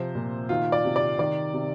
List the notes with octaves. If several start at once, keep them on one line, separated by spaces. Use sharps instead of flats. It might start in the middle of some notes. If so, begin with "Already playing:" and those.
Already playing: C3 F3 C5
A#2
D#3 F4
D5
C3
D5
D#3 D5
C3